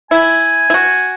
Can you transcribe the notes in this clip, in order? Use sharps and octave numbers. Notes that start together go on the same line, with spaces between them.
E4 G#5
E4
F#4